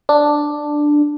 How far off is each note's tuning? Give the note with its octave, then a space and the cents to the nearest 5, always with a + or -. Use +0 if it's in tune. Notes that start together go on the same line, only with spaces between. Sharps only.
D4 +5